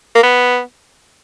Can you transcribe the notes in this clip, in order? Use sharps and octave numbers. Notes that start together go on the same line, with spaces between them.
A#3
B3